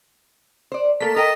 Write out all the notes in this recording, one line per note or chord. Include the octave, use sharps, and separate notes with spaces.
C5 D5
A3 A#3 A4 A#4 B6
A#4 D#5 G5